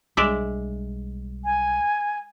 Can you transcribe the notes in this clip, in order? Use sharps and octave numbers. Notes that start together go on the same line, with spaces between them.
B1 G3 G#3 D4 D5 E5
G#5